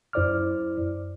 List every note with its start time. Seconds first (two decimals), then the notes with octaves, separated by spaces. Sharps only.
0.13 F#2 E4 C5 D5 D6 F6